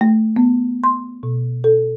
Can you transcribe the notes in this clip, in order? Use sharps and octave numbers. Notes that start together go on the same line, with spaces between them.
A3
B3
C6
B2
A4